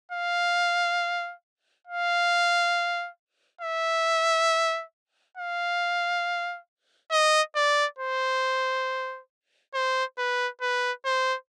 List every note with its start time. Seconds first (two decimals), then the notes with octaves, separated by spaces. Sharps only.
0.12 F5
1.87 F5
3.61 E5
5.37 F5
7.11 D#5
7.55 D5
7.98 C5
9.74 C5
10.18 B4
10.61 B4
11.05 C5